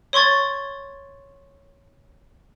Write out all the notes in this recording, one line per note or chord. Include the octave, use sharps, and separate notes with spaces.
C#5 C6 C#6 G#6 A6